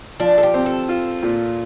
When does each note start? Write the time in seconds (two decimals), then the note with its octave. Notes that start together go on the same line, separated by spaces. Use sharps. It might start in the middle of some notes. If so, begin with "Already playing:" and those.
0.20 F3 D4
0.38 A4
0.43 G4
0.54 C4
0.66 A4
0.89 F4
1.23 A#2